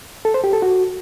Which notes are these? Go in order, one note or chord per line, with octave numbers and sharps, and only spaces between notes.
A4
C5
G4
A4
F#4